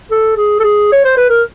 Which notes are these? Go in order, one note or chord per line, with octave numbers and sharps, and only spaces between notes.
A4
G#4
A4
G#4
C#5
C5
B4
A#4